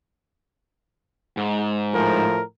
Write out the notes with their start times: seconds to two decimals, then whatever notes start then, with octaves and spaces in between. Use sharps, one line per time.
1.37 G#2
1.92 A2 F3 A#4